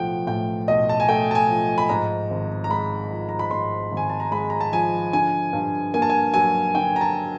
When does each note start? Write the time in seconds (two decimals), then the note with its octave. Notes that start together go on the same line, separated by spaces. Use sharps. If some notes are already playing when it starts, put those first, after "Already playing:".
Already playing: B1 A2 F3 A3 F#5 G5
0.27 A2 G5
0.68 B1 D#5
0.89 A5
1.00 G#5
1.09 A3 G5
1.31 A5
1.35 G#5
1.48 F3
1.78 B5
1.89 G#2 A#5
2.30 G#1
2.64 A#5
2.70 G#3 B5
3.11 F3
3.29 A#5
3.39 B5
3.51 G#2 C6
3.91 G#1
3.97 G#5
4.09 A5
4.20 A#5
4.32 G#3 B5
4.50 A#5
4.61 A5
4.72 F3 G#5
5.13 D3 G#5
5.53 G2
5.94 A#3 G#5
6.02 A5
6.10 G#5
6.34 F#3 G#5
6.75 D3 G5
6.96 A#5
7.01 A5